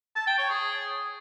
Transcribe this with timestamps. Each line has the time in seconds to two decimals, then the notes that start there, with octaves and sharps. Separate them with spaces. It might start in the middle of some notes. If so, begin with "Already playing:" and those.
0.16 A5
0.27 G5
0.38 C#5
0.50 G#4